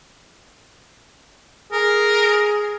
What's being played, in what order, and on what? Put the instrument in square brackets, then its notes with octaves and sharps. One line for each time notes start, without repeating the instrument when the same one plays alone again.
[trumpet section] G#4 [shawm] A#4